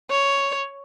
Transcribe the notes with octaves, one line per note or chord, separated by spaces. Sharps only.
C#5